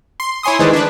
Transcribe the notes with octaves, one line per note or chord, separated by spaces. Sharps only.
C6
E4 C#5 G#5 C6 D#6
D#3 E3 G#3 B4 C5 D5
D4 B4